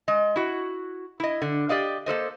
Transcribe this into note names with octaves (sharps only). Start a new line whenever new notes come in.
G#3 D#5
E4 F#4
E4 D#5
D3
G4 D5 D#5 F5
A#3 A4 C5 D#5